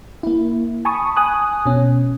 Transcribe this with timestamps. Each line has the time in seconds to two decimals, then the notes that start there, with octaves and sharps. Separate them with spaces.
0.23 A#3 E4
0.85 G#5 A5 B5 C#6 D#6
1.16 G#5 D#6 F#6
1.66 B2 C#4